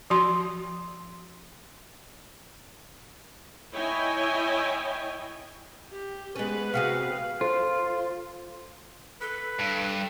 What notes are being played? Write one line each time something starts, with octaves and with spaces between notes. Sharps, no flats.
F3 F#4 C6
E4 C#5 D#5 G5 G#5
G4
G#3 B3 C#4 B4
C3 F#4 G#4 F5
F4 A4 C5
A4 B4
G2